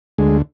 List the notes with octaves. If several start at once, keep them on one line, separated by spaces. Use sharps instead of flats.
D2 G#3